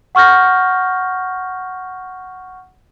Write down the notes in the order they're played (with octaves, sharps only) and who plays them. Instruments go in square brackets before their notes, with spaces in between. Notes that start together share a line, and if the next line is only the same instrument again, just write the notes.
[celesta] F#5 C#6 F6 G6 A#6